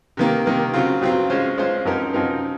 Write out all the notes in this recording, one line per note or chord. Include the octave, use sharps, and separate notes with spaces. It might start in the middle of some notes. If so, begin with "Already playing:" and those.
C3 D#3 A#3
C3 D#3 A#3
C#3 F#3 C4 F4
C#3 F#3 C4 F4
G#3 C#4 F4 C5
G#3 C#4 F4 C5
F#2 F3 C4 D#4 A#4
F#2 F3 C4 D#4 A#4